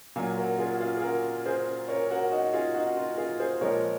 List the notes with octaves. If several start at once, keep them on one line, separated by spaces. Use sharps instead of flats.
A#2 F#3 F5 G#5
F#4 A#4
F4 G#4
F#4
F4
G#4
F#4 A#4
G#4 C5
A#4 C#5
F#4 A#4
D#4 F#4
F4 G#4
D#4 F#4
F4
F4 G#4
G#4 C5
A#2 F3 G#3 A#4 C#5